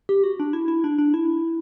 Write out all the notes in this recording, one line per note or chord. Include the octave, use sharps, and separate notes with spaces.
G4
F#4
D4
E4
E4
D4
D4
E4